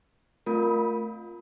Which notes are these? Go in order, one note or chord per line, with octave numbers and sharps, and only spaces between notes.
A3 C4 F4 A#4